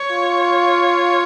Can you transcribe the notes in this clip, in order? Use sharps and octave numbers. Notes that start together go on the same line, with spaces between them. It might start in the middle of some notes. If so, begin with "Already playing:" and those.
Already playing: C#5
F4